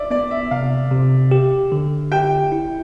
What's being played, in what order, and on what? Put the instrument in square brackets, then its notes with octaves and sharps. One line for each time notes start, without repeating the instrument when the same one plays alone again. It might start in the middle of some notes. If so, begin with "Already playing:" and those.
Already playing: [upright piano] D5 E5
[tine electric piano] B3 [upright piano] D5
[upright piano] E5
[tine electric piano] C3 [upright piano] F5
[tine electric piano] C3
G4
D3
[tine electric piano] G4 [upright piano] G5
[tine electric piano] E4